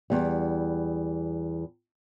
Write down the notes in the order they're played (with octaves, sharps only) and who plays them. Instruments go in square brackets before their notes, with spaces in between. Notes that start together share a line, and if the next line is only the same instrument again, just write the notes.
[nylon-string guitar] E2 G3